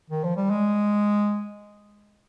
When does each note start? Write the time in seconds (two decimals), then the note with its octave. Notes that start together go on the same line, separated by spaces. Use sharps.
0.10 D#3
0.24 F3
0.37 G3
0.50 G#3